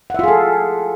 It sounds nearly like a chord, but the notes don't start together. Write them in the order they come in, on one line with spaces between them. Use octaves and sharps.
F#5 E5 F4 G#4 A4